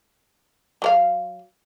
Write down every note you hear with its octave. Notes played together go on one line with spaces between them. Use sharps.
F#3 A#4 F5